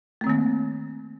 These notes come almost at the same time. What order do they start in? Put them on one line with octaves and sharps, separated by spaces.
A3 C4 D#3 A#3